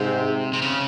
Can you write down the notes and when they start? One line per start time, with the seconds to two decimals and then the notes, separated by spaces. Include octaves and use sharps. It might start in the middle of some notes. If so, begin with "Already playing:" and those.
Already playing: G#2 C3 C4
0.53 C3
0.61 C#3